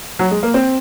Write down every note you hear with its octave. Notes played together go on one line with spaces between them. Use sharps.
F#3
G#3
A#3
C4